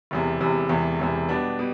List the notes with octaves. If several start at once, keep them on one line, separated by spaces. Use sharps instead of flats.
E1 E2 C3
E1 E2 C3
E1 E2 C3
E1 E2 C3
B2 G3 B3 D4
B2 G3